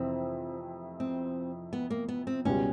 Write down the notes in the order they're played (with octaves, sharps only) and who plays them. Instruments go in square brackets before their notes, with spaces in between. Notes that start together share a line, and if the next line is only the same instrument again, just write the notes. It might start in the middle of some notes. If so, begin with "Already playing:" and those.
Already playing: [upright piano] F2 C3 E3 [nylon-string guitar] C4
[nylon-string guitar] C4
B3
A#3
B3
C4
[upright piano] C#2 B2 G3 [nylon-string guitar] C#4